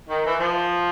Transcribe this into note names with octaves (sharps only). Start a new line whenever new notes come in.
D#3
E3
F3